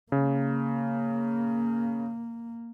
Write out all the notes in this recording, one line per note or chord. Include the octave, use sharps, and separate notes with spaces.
C#3 A#3